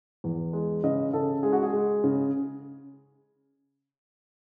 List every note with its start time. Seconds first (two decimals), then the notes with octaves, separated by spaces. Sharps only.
0.24 E2
0.53 G#3
0.84 C#3 D#5
1.13 C#3 A4
1.43 G#3 G#4
1.52 F#4
1.63 G#4
1.73 G#3
2.04 C#3